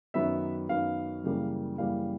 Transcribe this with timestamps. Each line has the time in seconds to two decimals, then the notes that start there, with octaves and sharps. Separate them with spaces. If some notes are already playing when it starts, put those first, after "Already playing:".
0.14 F#2 D#3 F#3 B3 E5
0.69 F#2 D#3 F#3 B3 F5
1.24 F#2 C#3 E3 G3 A#3
1.78 F#2 C#3 E3 G3 A#3 F5